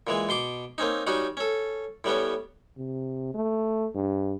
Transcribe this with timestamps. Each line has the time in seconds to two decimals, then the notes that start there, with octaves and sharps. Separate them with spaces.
0.07 A#2 E3 G#3
0.29 B2 C6 D6
0.78 A#3 C4 C#4 D#4
1.07 G3 C#4 D#4 F#4
1.37 C#4 A4
2.04 A2 G3 B3 C#4
2.77 C3
3.34 A3
3.94 G2